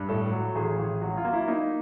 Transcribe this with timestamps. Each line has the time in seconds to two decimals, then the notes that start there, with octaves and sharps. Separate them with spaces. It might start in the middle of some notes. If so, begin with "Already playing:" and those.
Already playing: G2
0.09 A2 A4
0.31 F#3
0.55 A1 G#4
0.79 A1
1.01 F#3 F#4
1.17 F4
1.25 A#3
1.33 E4
1.48 A#3 D#4